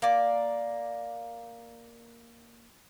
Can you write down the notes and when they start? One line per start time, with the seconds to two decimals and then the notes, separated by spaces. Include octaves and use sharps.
0.02 A#3 D5